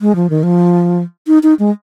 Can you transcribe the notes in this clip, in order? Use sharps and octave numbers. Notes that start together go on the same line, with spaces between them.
G#3
F3
D#3
F3
D#4
D#4
G#3